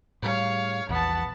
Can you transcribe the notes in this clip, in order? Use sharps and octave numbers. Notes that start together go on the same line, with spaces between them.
A2 G3 C#5 F5
A#1 E2 B3 A5